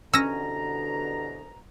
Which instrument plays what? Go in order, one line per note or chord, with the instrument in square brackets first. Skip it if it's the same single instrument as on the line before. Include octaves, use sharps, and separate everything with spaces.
[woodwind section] C2 B2 A#5 [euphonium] D3 [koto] C#4 [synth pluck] E6 A#6